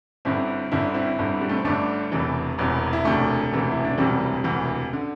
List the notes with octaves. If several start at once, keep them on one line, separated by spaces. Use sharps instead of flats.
G1 G2 D3 C4 E4
G1 G2 D3 E4
C4 E4
G1 G2 D3
G3
A3
C4
G1 G2 D3 A3 D4
E1 E2 C3 E3
E1 E2 C3 E3
E4
E1 D2 C3 E3 A3 D4
E1 D2 C3 E3
E4
D4
E1 D2 C3 E3 G3 C4
E1 D2 C3 E3
D3